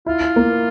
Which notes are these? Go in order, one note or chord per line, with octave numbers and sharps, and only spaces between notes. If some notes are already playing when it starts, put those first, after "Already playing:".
E4 F4
A#3